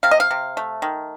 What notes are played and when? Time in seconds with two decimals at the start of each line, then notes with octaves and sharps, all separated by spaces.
0.03 C3 F5
0.11 D#5
0.20 F5
0.31 C3
0.57 A3
0.82 D#3